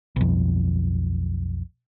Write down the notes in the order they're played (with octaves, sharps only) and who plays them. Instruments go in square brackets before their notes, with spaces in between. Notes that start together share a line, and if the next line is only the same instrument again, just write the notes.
[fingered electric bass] B1 F2